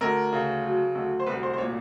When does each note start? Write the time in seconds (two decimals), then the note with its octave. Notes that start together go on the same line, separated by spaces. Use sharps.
0.01 D2 A#4
0.33 C#3
0.64 F#3
0.95 D2
1.20 C5
1.26 C2 B4
1.43 C5
1.53 C5
1.58 A#2 C#5